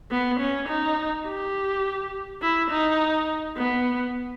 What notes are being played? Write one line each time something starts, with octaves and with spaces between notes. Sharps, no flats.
B3
C#4
D#4
G4
E4
D#4
B3